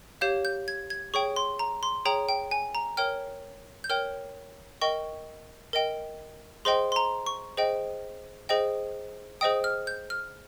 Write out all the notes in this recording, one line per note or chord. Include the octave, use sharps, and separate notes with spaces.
G4 C#5 F5 G6
G6
G#6
G#6
G#4 C#5 G5 C#6
C6
A#5
C6
G#4 C#5 G5 A#5
G5
G#5
A#5
A#4 C#5 G5 F6
G6
A#4 C#5 G5 F6
A#4 D#5 G5 C#6
A#4 D#5 G5
G#4 C5 D#5 G5 C6
C6
A#5
C#6
G#4 C5 D#5 G5
G#4 C5 D#5 G5
G#4 C5 D#5 G5 D#6
F6
G6
F6